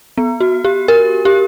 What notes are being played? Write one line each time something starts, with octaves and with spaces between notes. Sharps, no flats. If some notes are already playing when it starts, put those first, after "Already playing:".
B3
F#4
G4
A#4
G4